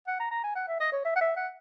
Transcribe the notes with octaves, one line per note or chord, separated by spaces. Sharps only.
F#5
A#5
A#5
G#5
F#5
E5
D#5
C#5
E5
F#5
E5
F#5